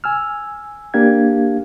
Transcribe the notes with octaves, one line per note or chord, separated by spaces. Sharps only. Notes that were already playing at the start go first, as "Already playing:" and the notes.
G#5 E6 F6
A#3 D4 G4 F5 G#6